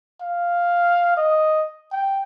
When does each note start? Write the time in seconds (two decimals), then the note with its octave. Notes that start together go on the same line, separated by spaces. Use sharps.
0.21 F5
1.17 D#5
1.92 G5